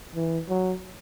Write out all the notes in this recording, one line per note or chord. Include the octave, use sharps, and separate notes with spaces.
E3
F#3